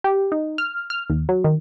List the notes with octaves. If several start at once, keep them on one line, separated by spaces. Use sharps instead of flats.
G4
D#4
F6
F6
D#2
F#3
D#3